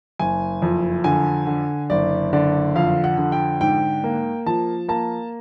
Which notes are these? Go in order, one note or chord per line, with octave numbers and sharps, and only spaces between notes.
F#1 G#5
F2
D3 G#5
D3
F#1 D5
D3 D5
F2 F5
F#5
D3
G5
G#2 G5
A#3
F3 A5
A#3 A5